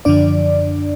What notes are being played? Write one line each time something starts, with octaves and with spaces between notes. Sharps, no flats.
F#2 D3 F3 D4 D5